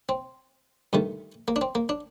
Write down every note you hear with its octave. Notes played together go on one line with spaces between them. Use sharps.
C4
G2 D#3 A3
A#3
D4
C4
A#3
D4